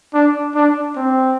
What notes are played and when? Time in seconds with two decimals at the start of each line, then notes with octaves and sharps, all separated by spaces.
0.13 D4
0.55 D4
0.96 C4